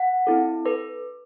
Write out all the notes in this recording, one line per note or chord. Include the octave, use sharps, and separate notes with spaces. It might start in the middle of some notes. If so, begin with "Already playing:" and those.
Already playing: F#5
C4 E4 A4
A4 B4